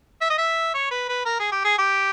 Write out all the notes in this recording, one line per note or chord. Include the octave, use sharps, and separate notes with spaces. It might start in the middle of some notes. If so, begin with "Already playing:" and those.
E5
D#5
E5
C#5
B4
B4
A#4
G#4
G4
G#4
G4